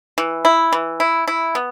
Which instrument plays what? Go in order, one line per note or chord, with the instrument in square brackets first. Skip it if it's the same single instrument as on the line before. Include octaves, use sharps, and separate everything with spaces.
[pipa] E3
E4
E3
E4
E4
B3